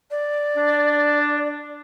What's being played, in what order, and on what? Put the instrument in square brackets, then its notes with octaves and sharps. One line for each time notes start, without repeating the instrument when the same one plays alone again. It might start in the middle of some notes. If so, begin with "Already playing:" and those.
[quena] D5
[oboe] D4